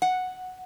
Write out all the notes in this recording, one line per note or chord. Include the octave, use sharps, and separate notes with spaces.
F#5